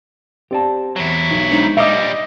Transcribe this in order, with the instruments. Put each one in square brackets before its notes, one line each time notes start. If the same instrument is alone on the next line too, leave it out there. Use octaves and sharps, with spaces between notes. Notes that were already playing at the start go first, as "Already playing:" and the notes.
[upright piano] C4 [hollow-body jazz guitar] G4 D5 A5
[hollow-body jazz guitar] E2 C#5 [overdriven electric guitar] F#3 E4
[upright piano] B1
[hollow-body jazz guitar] G#3 D4 C5 [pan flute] D#4
[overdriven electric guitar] A#2 G3 [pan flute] D#5 [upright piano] E5 D6 D#6